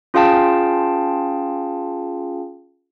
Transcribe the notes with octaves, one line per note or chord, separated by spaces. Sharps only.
C#4 F4 G#4 F5 G5 A5